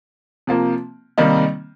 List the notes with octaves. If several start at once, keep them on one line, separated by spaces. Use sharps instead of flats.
C3 F3 A#3
C3 D#3 G3 A#3 D#4